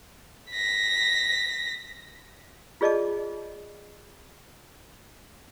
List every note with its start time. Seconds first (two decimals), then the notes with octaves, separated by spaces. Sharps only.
0.51 A#6 B6
2.81 F4 G#4 D5 D#5 A5 D6